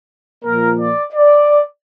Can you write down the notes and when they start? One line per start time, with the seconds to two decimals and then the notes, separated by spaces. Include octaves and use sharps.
0.45 A#2 F3 A#3 A#4
0.79 D5
1.13 D5